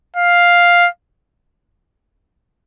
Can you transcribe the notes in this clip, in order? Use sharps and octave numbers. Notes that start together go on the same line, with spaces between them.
F5